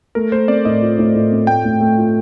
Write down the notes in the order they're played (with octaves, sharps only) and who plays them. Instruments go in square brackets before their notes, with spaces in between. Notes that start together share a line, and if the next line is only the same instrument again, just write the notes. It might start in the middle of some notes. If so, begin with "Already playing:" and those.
[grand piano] A3 [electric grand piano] A#4
[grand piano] A3 [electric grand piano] C5
[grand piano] C4 [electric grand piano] D5
[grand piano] A2 [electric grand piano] D#5
[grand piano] F4
A2
A2
C4
[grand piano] A3 [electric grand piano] G5
[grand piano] A2
A3
F4